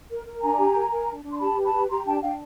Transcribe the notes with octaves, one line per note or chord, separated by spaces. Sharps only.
A#4
A#4
D4 G#5 A#5
G4
A#4
A#4
D4
D4
C6
G4 A5 B5
B4
A5 B5
G4
G4 A#5 C6
D4 G5 A5
D4 F5 G5